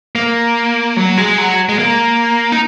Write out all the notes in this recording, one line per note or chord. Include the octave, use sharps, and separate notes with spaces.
A#3
F#3
G#3
F#3
G#3
A#3
D#4